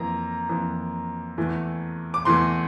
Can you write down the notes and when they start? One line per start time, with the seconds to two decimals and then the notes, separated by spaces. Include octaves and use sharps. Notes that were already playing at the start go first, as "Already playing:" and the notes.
Already playing: F2 E3 A#3 A#5
0.49 F2 E3 A#3
1.38 E2 E3 A3
2.14 D6
2.25 E2 E3 A3 C6